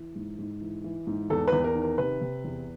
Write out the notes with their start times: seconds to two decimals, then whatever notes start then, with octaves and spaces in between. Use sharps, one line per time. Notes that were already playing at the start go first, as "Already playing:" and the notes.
Already playing: E3
0.15 G#2
0.38 G#2
0.61 E3
0.84 E3
1.07 G#2
1.30 E2 A4
1.47 E2 B4
1.64 A#4
1.75 D#3
1.82 A#4
1.98 C3 B4
2.21 C3
2.44 E2